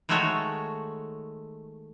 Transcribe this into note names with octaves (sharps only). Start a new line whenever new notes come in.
D#3 G#3 A3 F#4 A4 C#5